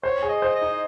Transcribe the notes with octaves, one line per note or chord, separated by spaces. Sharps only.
C5 C#5
G#4
D#5
C5
D#5
D#4